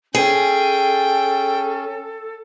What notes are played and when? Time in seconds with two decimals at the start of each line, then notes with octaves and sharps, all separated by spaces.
0.15 C#4 G#4 A4 G5